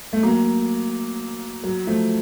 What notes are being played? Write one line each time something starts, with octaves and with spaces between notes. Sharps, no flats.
A3
F#3 A#3
F#3
F3 A3